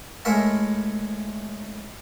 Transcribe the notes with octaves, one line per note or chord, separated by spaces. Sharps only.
A2 G#3 A3 A#4 E5 A5